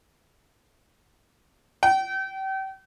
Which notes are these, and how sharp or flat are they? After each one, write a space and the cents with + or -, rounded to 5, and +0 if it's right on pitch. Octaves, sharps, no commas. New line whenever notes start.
G5 -35